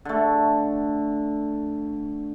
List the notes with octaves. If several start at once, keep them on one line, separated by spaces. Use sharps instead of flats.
D3 A3